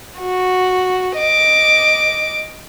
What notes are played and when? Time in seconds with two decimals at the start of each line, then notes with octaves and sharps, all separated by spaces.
0.19 F#4
1.17 D#5 D6